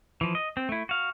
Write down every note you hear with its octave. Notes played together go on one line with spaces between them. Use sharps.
E3 F3
D#5
C4
A3 E4
F#4 F5